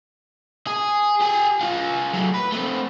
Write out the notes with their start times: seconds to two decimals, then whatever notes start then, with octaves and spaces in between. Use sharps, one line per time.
0.67 G#4
1.21 G4 G#5
1.61 F4 G#4
2.13 F#3 A3
2.34 B4
2.52 A3 C4